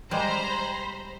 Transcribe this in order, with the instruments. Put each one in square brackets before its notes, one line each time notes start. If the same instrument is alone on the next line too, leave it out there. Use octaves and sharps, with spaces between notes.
[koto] G3 G#3 [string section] C5 A#5 B5